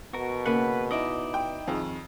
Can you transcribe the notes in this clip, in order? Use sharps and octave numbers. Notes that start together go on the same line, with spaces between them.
B2 F#4 A#4
C#3 A#3 B4 F#5
D#4 E4 D5 D#5
G5
F2 D#3 G#4